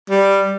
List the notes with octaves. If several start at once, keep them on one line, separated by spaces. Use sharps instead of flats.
G3